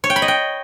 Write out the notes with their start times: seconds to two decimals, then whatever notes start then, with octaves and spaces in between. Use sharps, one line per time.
0.04 C#5
0.10 G5
0.16 B5
0.22 D#5
0.28 G5